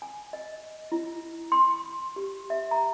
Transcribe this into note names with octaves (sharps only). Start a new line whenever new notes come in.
G#5
D#5
E4
C6
G4
E5
A#5